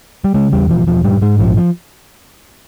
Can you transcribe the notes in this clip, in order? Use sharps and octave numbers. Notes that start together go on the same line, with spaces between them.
G3
C#3 G#3
E2 G3
E1 F3
E1 F3
G#2 G3
G#2 G#3
A#1 F3
F3